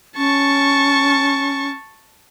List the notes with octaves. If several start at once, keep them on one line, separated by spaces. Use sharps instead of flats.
C#4 A5 C#6